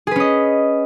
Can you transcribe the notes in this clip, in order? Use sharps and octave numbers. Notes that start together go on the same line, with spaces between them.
C#4 G#4 B4 D#5